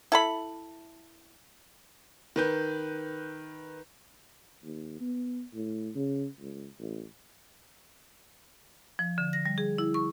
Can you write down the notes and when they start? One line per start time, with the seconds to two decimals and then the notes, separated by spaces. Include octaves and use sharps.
0.12 E4 A4 B5
2.36 D#3 B4 G6
4.64 D#2
5.01 B3
5.54 A2
5.95 C#3
6.40 C#2
6.79 A1
8.99 F3
9.18 D3
9.33 A#6
9.46 G3
9.58 G#4
9.78 E4
9.94 C#6